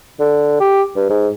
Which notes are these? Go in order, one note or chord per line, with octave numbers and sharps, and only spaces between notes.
D3
G4
G2
G#2